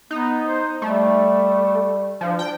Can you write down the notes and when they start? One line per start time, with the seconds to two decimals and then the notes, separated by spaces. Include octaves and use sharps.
0.11 B3 D#4
0.43 C5
0.82 G3 A3
2.21 F3 D4
2.39 G5